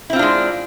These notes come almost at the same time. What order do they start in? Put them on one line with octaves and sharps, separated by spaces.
E4 C4 F4 D4 G#3